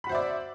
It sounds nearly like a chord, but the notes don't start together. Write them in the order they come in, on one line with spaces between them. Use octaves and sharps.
B5 F#4 C5 E5 D5